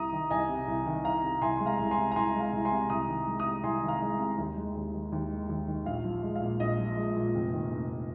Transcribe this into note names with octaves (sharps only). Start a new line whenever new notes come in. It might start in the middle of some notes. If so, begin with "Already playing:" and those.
Already playing: C2 A#5 D#6
D#3
C2 D#5 G#5
C3
C2
D#3
C2 F5 A#5
C3
C2 G#5 C6
G#3 C6
F5 A#5
C2
G#5 C6
C3
A#5
C2 G#5 C6
G#3
F5 A#5
C2
G#5 C6
C3
C2 A#5 D#6
D#3
G#3
A#5 D#6
C3
C2 G#5 C6
D#3
F5 A#5
G#3
C3
D#2
G#3
D#2
D#3
D#2
G#3
D#2
D#3
A#1 F5
F3
G#3
F5
A#2
A#1 D#5
F3
G#3
A#2
F1
D#3
F1